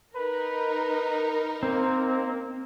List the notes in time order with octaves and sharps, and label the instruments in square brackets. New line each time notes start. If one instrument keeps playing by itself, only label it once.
[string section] D#4 A#4 [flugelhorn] B4
[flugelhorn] A#3 [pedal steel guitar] C4